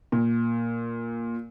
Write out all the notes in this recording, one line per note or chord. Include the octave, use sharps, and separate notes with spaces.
A#2